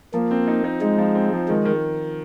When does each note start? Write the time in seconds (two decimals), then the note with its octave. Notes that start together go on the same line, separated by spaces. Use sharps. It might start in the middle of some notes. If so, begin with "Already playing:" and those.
0.14 F3 A#3
0.31 C4
0.48 D#4
0.64 D#4
0.81 G#3 D#4
0.98 F3
1.15 C4
1.33 F3
1.48 D#3 G#3
1.65 D#3